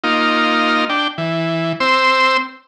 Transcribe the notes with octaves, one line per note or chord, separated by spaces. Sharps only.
A#3 D#4 F4
D4 G5
E3
C4 C5 E6